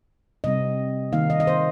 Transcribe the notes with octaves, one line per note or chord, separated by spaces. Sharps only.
C3 G3 C4 D#5
D#3 A#3 D#4 F5
D#5
D#5
C5